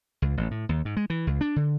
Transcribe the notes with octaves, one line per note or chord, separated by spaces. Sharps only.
C#2
A1
A2
D#2
G#2
G#3
E3
C#2
D4
D3